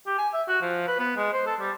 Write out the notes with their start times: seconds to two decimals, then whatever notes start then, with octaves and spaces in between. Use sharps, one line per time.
0.07 G4
0.18 G#5
0.34 E5
0.48 F#4
0.61 F3
0.87 B4
0.99 B3
1.17 G#3
1.33 C5
1.46 A4
1.60 G3